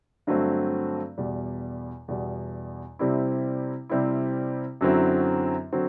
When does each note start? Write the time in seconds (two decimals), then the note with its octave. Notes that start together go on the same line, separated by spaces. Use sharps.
0.27 G2 D3 F#3 A3 C4
1.18 E2 B2 G3
2.08 E2 B2 G3
2.99 C3 G3 C4 E4
3.89 C3 G3 C4 E4
4.81 F#2 D3 F#3 C4 E4
5.73 D3 F#3 C4